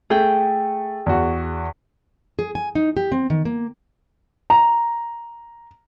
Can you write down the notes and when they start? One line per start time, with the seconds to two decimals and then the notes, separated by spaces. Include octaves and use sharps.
0.10 A3 G#4 G5
1.06 E2 F#4
2.39 G#4
2.55 G#5
2.75 D#4
2.97 G4
3.12 C4
3.30 D#3
3.45 A#3
4.50 A#5